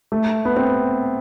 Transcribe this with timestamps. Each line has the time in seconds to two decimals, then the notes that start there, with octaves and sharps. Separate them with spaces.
0.12 A3
0.45 B3
0.56 C4